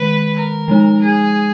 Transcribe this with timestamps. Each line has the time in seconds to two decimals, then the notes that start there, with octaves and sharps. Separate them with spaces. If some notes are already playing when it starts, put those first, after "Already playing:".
Already playing: D#3 G#3 B4
0.34 A#4
0.68 F3 G#3 D#4
1.01 G#4